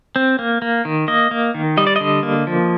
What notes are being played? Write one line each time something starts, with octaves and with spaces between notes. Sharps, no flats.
C4
A#3
A#3
D#3
A#3 D#5
A#3
D#3
G3 D#5
D5
D3 D#5
A#3
F3